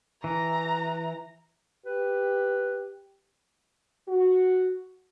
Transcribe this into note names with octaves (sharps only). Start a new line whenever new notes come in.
E3 A#5
G4 B4
F#4